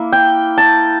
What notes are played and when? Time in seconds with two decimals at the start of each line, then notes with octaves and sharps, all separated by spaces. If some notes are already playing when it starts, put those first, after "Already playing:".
Already playing: A#3 E4
0.12 G5
0.58 A5